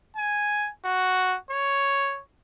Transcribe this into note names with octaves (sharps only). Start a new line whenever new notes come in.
G#5
F#4
C#5